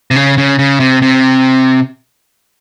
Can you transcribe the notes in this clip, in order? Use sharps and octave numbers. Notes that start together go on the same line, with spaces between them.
C3
C#3
C#3
C#3
C3
C3